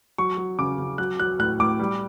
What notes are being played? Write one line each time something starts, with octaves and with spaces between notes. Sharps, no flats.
F#3 C#6
F#3
C#3 D6
C#3
F#3 F#6
F#3 F#6
A2 F#6
A2 D6
G3